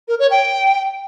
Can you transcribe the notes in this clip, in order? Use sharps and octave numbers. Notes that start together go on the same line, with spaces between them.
A#4
C#5
G5